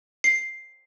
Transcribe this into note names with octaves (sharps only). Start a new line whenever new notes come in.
C7